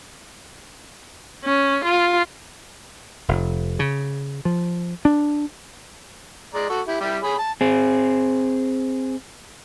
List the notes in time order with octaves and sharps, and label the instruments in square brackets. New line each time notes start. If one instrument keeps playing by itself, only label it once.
[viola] C#4
F4
[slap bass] F1
C#3
F3
D4
[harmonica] G#3 D5 A#5
F#4 A4 C#6
E4 G4
G3 E4 G4
G#4 C#5 B5
A5
[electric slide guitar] C4 G#4